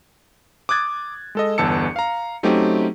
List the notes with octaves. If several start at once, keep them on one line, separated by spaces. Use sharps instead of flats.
D6 D#6 F#6 G#6 A6
G#3 A4 D#5
G1 E2 A5 E6 C#7
F5 A#5
F#3 A3 C4 C#4 D#4 G4